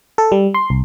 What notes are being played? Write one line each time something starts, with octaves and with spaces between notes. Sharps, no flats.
A4
G3
C6
C2